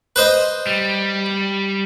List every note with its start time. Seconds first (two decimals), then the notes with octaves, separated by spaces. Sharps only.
0.16 B4 C5 D#5
0.67 G3